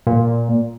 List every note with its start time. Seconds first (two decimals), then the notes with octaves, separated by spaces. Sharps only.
0.07 A#2